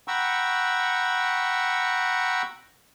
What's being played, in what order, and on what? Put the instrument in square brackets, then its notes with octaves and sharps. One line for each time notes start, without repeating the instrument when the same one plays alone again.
[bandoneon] F#5 G5 A#5 B5 C#6 E6